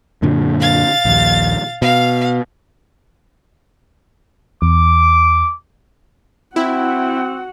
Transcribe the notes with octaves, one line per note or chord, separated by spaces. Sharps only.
F#2 A#2 D3
F5 A6
A#1 D#2
B2 F5
E2 D6
C4 E4 F#4 F#5